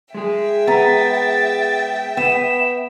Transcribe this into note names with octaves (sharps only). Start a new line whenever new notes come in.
G#3 G#4 E5 G5
B3 A#5 A6
B3 E7